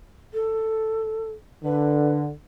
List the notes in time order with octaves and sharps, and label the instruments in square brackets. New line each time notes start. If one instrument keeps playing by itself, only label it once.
[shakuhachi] A4
[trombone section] D3 [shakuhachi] B4